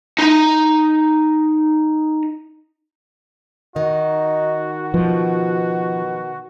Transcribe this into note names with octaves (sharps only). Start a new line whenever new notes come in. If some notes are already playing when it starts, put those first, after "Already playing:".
D#4 A#5
D#3 D#4 F#4
B2 F3